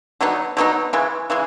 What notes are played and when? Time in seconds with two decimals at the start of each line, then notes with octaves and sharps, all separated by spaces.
0.21 D3 F#3 B3 D#4
0.57 D3 F#3 B3 D#4
0.93 C#3 E3 G#3
1.30 C#3 E3 G#3